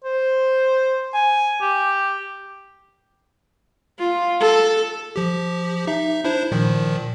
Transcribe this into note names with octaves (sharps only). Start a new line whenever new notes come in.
C5
G#5
G4
F4
A4
F3 G4
D#4 E5
D4 E4 C5
A#2 D#3 F3